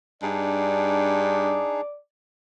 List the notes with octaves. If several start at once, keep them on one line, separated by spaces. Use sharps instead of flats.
G2 D4 D#4 G#4 D5